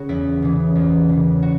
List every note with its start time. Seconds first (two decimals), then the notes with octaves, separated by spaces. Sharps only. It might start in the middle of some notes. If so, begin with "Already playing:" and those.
Already playing: C#3 F#4 G#4
0.09 E2 E4
0.42 C#3 E3
0.76 E2
1.09 C#3 E3
1.43 F#4